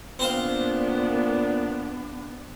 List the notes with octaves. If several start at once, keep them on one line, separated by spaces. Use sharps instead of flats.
A#2 B3 C4 D4 C5 F5